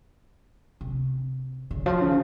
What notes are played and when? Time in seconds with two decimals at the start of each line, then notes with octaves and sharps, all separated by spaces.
0.81 C3
1.71 C#3
1.86 F3
2.01 C#3